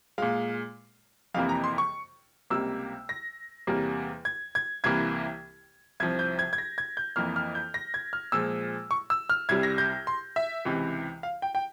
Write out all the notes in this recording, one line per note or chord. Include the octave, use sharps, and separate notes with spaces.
A#2 G#3 F5
F2 C3 E3 A#3 F5
A#5
C6
C#6
C#2 C3 G3 A#3 E6
A#6
E2 C3 G3 A#3
G#6
G#6
C2 C3 E3 A#3 G#6
C2 C3 F3 G#6
G6
G#6
G#6
A#6
G#6
G6
F2 E3 A#3 F6
F6
G6
A#6
G#6
F6
A#2 F3 G#3 E6
C#6
E6
F6
C2 C3 G3 G#6
A#6
G6
C6
E5
C#2 C3 E3
F5
G5
G5